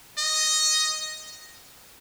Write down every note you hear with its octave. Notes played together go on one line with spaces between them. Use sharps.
D#5